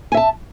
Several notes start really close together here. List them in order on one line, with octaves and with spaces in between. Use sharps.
G#5 E5 A5